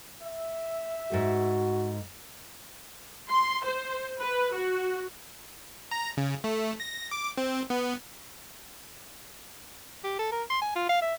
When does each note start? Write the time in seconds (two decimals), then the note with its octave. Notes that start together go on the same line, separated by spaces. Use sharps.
0.24 E5
1.12 G#2 A3 F#4
3.30 C6
3.65 C5
4.20 B4
4.53 F#4
5.91 A#5
6.17 C#3
6.44 A3
6.80 A#6
7.11 D6
7.38 C4
7.70 B3
10.04 G4
10.19 A4
10.32 A#4
10.50 C6
10.62 G#5
10.76 F4
10.89 F5
11.02 E5